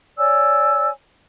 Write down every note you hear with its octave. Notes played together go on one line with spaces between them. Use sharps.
C#5 D5 G#5 E6